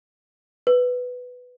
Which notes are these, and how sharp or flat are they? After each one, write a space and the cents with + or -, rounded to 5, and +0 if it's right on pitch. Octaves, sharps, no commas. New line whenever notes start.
B4 +5